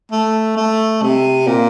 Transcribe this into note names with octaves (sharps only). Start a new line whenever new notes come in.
A3
A3
C3
A#2